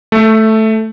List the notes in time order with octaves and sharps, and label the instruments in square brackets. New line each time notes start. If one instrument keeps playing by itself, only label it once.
[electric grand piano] A3